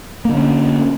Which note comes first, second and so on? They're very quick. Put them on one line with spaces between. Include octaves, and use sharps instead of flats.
A#3 D3 C#4